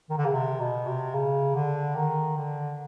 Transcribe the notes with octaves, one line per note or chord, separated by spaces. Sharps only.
D#3
D3
C#3
C3
B2
C3
C#3
D3
D#3
D3